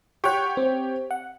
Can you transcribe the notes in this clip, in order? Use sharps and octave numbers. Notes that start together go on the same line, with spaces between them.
G4 C#5 F#5 G5 C#6
C4
F#5